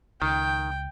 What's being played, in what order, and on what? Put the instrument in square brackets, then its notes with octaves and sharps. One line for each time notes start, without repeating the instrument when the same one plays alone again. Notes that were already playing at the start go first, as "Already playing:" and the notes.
[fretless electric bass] C#2 [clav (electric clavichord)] D#3 [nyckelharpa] G5